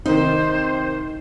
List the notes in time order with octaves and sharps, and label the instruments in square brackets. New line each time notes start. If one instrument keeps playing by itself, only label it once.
[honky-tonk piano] C3 D#3 [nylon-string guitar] D#4 [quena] C5